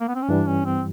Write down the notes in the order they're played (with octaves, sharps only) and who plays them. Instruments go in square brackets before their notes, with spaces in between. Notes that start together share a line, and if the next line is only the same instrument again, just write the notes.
[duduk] A#3
B3
C4
C#4
[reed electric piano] G2 E3 G3 [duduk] D4
[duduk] C#4
C4